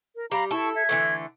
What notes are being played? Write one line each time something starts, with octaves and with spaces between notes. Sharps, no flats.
A#4
G3 F5 A#5 B5
E4 A4 A5 C#6
E5 G#6
D3 E3 A3